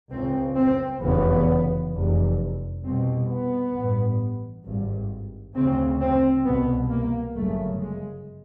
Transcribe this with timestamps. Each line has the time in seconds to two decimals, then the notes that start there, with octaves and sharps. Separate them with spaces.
0.11 C#2 C#3 C4
0.56 C4
1.01 F1 E2 C#3 B3
1.92 F1 E2 C3
2.82 C2 B2 C4
3.28 B3
3.74 A1 G2
4.64 G#1 G2
5.54 D2 C#3 C4
5.99 C4
6.45 C2 B2 B3
6.90 A#3
7.35 G1 F#2 C#3 A3
7.81 G#3